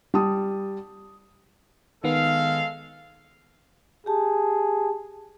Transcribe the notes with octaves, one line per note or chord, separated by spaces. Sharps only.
G3 A5 D#6
D#3 G#3 B3 A4 F5
G4 G#4 A5